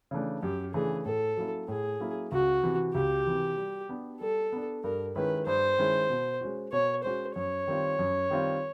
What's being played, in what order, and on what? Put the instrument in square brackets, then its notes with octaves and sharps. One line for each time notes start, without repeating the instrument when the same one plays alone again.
[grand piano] C#3 E3 A3 D4
[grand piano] F#2 [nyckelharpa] G4
[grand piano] C#3 E3 A3 D4 [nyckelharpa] G#4
[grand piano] A2 [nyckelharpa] A4
[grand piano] F#3 A#3 C#4 E4
[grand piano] A2 [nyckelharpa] G#4
[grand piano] F#3 A#3 C#4 E4
[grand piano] C#2 [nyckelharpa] F#4
[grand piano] C3 E3
[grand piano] C#2 [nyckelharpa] G4
[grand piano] C3 E3
G3
B3 D4
[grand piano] G3 [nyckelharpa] A4
[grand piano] B3 D4
[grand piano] G2 [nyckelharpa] A#4
[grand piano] D#3 G#3 C#4 E4 [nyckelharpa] B4
[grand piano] G2 [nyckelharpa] C5
[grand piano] D#3 G#3 C#4 E4
B2
G#3 C#4 F#4
[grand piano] B2 [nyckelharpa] C#5
[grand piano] G#3 C#4 F#4 [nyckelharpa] C5
[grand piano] F#2 [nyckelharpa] C#5
[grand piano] D#3 G3 C4 F4
F#2
D#3 G3 C4 F4